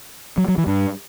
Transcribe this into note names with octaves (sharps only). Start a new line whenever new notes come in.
F#3
F#3
E3
G2